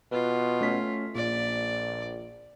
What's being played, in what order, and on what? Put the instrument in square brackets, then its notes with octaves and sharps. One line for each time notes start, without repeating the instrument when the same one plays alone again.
[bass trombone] B2 [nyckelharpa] F4 [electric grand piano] B4
[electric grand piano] A3 C#4 B6
[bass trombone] A#1 [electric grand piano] A#2 [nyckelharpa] D5